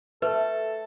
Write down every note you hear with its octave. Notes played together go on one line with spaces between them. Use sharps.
A3 A4 B4